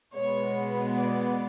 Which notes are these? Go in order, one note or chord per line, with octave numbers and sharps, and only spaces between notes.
B2 G#3 B3 C#5
D5